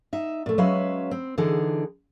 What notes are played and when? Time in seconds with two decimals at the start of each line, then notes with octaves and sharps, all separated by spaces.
0.13 D#4 E5
0.46 A#2 A3
0.58 F#3 G#3 C#4 B4 E5 F5
1.11 C4
1.38 D3 E3 D#4 G#4